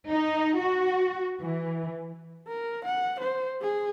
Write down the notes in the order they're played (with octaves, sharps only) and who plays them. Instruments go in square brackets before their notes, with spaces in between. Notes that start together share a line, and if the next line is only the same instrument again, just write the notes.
[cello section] D#4
F#4
E3
[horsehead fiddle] A#4
F#5
C5
G#4